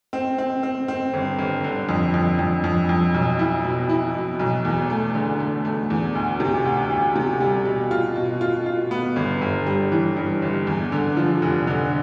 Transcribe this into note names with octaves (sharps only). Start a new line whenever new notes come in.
C4
C4
C4
C4
G1
G1
D3
F2
F2
F2
F2
F2
B1
E4
B2
E4
B2
B1
E2
A3
D3
A3
A3
E2
D2
C3
D2
D2
C3
G3
B2
F4
B2
F4
F4
B3
G1
G1
G3
E3
G2
G1
E2
D3
F3
F1
D3